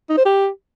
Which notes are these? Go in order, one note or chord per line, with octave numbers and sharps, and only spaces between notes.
D#4
C5
G4